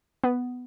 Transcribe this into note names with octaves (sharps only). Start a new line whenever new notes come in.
B3